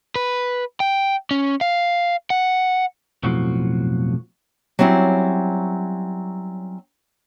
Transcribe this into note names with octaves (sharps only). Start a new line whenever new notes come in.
B4
G5
C#4
F5
F#5
B1 F2 A2 F3 F#4
F#3 G3 C4 C#4 E4